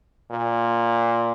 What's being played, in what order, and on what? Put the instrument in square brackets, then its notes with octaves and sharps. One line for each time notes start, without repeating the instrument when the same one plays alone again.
[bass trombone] A#2